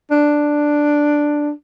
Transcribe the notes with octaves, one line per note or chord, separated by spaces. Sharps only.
D4